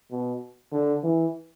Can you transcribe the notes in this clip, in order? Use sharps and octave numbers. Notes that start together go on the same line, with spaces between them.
B2
D3
E3